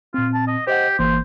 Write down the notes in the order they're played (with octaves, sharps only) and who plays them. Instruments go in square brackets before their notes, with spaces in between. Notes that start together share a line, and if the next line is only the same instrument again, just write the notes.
[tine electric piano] A#2 C4 [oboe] F4
[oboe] A5
D#5
[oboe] G4 [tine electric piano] C5 D#5 F#5
[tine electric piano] G1 E3 A#3 [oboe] C5